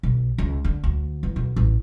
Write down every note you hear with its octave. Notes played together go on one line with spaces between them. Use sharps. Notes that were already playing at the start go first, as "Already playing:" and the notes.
B1
C#2
D3
D2
E2
B1
A1